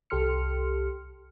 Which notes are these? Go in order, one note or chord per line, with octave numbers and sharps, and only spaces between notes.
C2 G4 A4 C6 F6 C#7